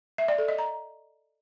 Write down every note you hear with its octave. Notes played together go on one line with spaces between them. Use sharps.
E5
D5
A4
D#5
A#5